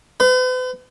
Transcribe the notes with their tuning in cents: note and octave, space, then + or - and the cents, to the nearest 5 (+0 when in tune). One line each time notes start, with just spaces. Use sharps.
B4 +45